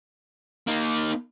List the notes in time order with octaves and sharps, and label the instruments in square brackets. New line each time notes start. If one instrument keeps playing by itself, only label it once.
[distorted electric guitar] A#3 D#4